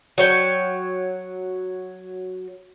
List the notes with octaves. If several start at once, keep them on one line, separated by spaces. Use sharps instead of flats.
F#3 C#5 G5